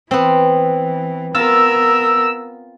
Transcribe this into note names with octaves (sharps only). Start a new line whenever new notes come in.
E3 B3 C4
B3 F4 A#4 E6